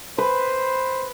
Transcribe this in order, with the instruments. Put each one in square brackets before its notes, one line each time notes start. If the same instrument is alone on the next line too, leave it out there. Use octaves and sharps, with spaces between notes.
[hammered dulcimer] B4 [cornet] C5